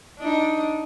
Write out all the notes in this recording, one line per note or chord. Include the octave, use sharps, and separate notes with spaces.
D4 D#4